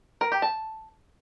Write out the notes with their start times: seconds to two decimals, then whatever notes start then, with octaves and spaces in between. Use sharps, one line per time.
0.21 A#4
0.32 G4
0.42 A5